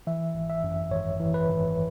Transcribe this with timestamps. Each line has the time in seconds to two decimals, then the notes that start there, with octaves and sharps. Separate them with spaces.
0.07 E3 E5
0.34 G#1
0.50 E5
0.64 F#2
0.91 G#1 C#5
1.20 E3
1.34 B4
1.48 G#1